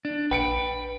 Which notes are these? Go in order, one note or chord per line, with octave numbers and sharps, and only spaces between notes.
D4
A#1 B4 G5 C#7 D7